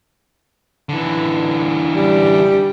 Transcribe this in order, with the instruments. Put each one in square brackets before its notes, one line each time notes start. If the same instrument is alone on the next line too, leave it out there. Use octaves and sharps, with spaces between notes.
[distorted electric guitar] D3 E3
[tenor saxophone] G3